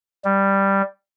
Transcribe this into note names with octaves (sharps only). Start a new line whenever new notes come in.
G3